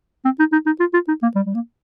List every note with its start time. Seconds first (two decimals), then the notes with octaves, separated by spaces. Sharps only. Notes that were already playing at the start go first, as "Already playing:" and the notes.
0.25 C4
0.39 D#4
0.52 D#4
0.66 D#4
0.80 F4
0.94 F4
1.08 D#4
1.23 A#3
1.36 G3
1.47 G3
1.54 A#3